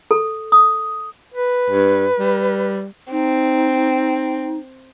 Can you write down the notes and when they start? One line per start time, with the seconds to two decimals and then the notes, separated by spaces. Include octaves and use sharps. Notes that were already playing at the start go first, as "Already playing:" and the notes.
0.11 A4
0.52 D#6
1.34 B4
1.71 G2
2.19 G3
3.12 C4 D#4